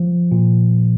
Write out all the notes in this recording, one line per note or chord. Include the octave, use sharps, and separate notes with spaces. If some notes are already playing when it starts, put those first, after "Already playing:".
Already playing: F3
A#2